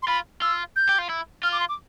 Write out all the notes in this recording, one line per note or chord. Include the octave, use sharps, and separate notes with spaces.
C6
F4 B5
F4 E6
G6
G4
F4
E4
F4 F6
D6
C6
D6